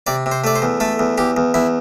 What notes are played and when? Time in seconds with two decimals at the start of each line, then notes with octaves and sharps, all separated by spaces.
0.07 C3 D5
0.26 C3
0.32 C5
0.44 A3 D5
0.56 C5
0.62 E2
0.80 A3 A4
0.99 E2
1.18 E2 G4
1.37 E2
1.54 E2 E4